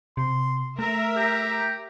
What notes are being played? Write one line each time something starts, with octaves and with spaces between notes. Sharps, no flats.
C3 C6
A3 A#4 E5 A#5
G4 A#5